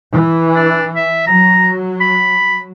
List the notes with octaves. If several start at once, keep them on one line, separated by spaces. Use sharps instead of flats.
E3
D4
E5
F#3 A#5
B5